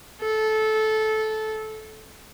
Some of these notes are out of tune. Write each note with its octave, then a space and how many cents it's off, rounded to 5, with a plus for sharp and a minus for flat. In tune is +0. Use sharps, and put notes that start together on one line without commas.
A4 -15